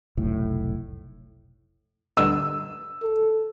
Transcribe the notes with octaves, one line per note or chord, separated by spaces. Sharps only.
F1 B1 A2
G2 D3 D#4 E6
A4